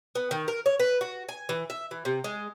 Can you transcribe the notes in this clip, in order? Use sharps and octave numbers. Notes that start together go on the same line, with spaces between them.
B3
D#3
A#4
C#5
B4
F#4
G#5
E3
E5
E3
C3
G#3